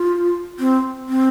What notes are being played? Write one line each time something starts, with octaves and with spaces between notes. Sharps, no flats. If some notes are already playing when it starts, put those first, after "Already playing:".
Already playing: F4
C4
C4